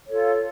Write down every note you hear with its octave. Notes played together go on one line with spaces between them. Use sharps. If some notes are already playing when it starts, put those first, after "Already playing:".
F4 A4 C#5